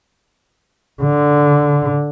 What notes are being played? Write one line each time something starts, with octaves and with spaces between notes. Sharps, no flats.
D3